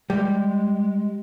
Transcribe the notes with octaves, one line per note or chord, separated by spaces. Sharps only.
G3 G#3